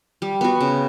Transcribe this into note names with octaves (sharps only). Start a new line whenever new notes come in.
G3
B3 F#4
C#3